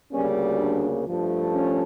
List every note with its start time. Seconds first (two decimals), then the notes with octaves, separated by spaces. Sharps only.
0.12 D2 C#3 G3 A#3 C#4
0.59 D4
1.07 G2 F3 A3
1.53 C#4